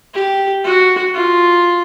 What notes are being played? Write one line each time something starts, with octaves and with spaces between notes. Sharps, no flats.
G4
F#4
F4